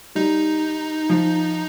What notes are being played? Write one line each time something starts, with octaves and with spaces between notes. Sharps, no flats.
G3 D#4
F3